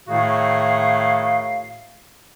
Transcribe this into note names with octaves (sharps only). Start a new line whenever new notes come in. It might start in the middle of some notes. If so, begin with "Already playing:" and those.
A2 D#3 A3 F#4 G#4 F5